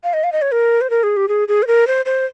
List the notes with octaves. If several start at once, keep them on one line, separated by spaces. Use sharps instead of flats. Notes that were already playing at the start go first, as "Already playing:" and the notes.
F5
D#5
F5
D#5
C#5
A#4
C5
A#4
G#4
G4
G#4
G#4
C5
A#4
C5
C5